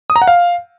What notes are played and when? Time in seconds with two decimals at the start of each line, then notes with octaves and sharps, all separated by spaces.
0.10 D#6
0.16 A#5
0.22 F#5
0.28 F5